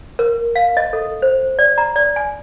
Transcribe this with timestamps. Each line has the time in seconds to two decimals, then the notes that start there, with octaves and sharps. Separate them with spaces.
0.19 A#4
0.56 F5
0.77 D#5
0.93 A4
1.22 C5
1.59 D5
1.78 A#5
1.96 D5
2.16 G#5